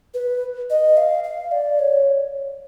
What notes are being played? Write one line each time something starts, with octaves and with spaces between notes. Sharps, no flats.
B4
D#5
F5
F5
D5
C#5